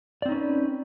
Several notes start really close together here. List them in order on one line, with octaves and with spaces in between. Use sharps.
D5 C4 D#4 C#4 B4